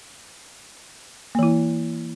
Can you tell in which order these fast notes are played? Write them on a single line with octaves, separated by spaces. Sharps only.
A#3 E3 E4